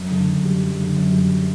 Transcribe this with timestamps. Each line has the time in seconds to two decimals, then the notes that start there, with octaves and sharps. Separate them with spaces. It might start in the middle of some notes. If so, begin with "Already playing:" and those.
Already playing: F#2
0.10 D3
0.27 F#2
0.45 G3
0.62 F#2
0.79 D3
0.96 F#2
1.13 G3